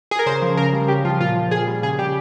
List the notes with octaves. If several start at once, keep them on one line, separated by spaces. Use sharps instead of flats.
G#4
A#4
C#3 C5
F3
C#3 A#4
G3
C#3 G4
F3 F4
A#2 F4
F3
A#2 G#4
G3
C#3 G#4
G3 G4